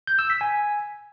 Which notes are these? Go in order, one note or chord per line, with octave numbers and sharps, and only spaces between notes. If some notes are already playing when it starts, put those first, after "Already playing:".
G6
E6
B6
G#5